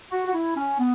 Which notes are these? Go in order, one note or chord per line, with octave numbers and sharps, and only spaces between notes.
F#4
F#4
E4
C#4
B3